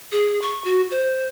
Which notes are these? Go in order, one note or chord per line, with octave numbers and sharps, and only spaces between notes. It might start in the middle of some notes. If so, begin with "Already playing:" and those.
G#4
C#6
F#4
C5